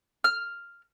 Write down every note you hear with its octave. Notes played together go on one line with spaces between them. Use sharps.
F6